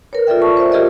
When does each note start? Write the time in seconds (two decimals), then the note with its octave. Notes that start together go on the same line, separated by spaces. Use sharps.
0.13 A#4 B4 C#5
0.27 F4 A4 D5 E5 G5
0.42 A5 C#6
0.57 C5 E5
0.72 F4 G4 G#4 A#4 C5 D#5